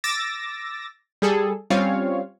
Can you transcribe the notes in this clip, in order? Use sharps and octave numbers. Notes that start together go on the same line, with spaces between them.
D6 E6 A6 A#6
G3 G#4 A4
G3 C4 C#4 F4 C#5 F5